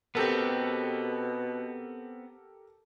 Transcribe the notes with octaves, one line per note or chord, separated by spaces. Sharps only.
B2 B3 C4 G4 A4 A#4